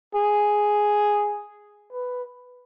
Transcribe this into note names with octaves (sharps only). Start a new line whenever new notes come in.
G#4
B4